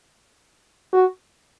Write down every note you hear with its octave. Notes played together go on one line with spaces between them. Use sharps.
F#4